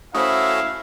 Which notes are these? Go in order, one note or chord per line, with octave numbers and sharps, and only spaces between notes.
A3 C#4 E4 F#4 C5 F5 D#6